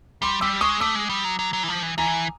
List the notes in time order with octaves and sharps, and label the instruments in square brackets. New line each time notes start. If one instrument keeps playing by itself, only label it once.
[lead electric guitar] G3 [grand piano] C6 D6
[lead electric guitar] G3 [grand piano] D6 E6
[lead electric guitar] G#3 [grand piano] C#6 D#6
[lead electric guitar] A3 [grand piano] D6 E6
[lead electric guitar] G#3
G3
F#3
F#3
F#3
E3
F3
E3
[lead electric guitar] E3 [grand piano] G#5 A#5